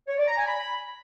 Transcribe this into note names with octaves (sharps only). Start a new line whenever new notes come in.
C#5
D5
A#5
G#5
B5